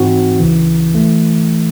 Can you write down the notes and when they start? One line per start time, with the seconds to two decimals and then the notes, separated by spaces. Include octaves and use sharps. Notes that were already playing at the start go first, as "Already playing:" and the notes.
Already playing: G#2 E3 C4 D#4 F#4
0.40 C#2 C#3 E3
0.94 E3 A3